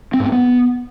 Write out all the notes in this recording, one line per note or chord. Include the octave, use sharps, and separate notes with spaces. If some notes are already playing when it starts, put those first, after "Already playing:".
C4
G#2
C4
B3